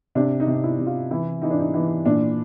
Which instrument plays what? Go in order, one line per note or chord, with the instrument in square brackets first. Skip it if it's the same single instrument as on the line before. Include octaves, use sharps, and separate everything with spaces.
[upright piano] C3 D4
D#4
C3
E4
C3
F4
E3 E4
E3 D#4
D4
D#4
E3 D#4
A#2 D4